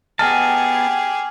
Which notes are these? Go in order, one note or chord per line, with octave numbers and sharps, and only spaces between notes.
B3 G4 G#4 D#5 G#5 A5 F6